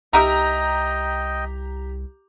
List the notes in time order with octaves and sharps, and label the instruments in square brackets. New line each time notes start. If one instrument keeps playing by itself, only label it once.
[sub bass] C2 [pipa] D#4 A#4 E5 [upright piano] G4 A#5 [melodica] D#5 G5